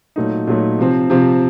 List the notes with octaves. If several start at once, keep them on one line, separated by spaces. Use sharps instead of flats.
A#2 F#3 A3 D#4
A#2 F#3 A3 D#4
C3 F3 C4
C3 F3 C4